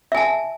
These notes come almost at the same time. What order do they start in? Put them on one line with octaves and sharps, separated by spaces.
E5 G#5 A5